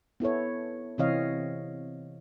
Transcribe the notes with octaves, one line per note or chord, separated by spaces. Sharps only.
B3 E4 A4 C#5
C3 E3 C4 C#5 D#5 F5